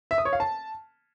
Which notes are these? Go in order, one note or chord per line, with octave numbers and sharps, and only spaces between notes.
E5
D#6
C#5
F5
A5